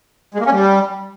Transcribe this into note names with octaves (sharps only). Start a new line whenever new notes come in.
G#3
A#3
C#4
G3